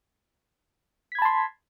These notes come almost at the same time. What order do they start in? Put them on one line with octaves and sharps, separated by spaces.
B6 G#6 B5 A5 C6